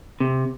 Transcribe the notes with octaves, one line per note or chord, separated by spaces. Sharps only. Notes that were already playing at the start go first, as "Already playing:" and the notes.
C3